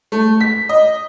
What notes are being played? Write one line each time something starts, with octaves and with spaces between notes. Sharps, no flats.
A3
B6
D#5